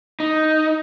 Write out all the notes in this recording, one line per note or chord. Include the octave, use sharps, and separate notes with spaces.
D#4